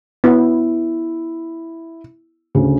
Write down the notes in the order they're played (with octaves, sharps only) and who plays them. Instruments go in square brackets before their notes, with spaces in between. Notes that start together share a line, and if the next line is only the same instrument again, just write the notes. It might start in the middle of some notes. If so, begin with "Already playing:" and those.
[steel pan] B3 [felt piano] E4
[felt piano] D2 C#3